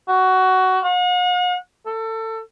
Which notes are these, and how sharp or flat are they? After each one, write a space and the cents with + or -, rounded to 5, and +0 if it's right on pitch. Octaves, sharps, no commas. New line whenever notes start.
F#4 +15
F#5 -45
A4 +25